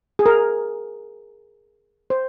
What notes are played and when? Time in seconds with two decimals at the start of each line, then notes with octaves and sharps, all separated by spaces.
0.19 G#4
0.26 A#4
2.10 C5